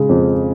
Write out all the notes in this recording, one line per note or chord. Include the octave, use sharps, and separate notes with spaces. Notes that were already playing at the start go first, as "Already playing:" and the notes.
Already playing: C#3 G#3
F2